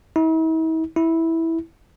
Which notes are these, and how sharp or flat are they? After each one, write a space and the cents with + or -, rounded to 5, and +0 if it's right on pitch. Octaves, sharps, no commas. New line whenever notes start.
E4 -45
E4 -10